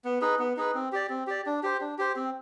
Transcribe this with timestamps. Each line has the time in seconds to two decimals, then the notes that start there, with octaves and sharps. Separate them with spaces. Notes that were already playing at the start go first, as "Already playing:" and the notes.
0.05 B3
0.21 D#4 G#4 B4
0.39 B3
0.57 D#4 G#4 B4
0.75 C4
0.92 G4 D5
1.09 C4
1.27 G4 D5
1.46 D4
1.63 G4 C5
1.81 D4
1.98 G4 C5
2.16 C4